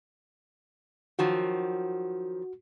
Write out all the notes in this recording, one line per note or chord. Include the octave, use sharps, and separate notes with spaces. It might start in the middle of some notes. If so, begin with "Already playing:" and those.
D#3 F3 F#3 F#4